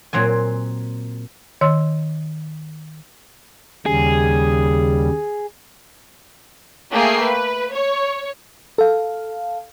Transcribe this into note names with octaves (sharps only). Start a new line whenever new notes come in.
A#2 F#3 C4 G#5
D#3 C#5 C6 E6
D#2 C#3 G3 G#4
A3 A#3 G#4 G5 C7
B4
C#5
A4 F5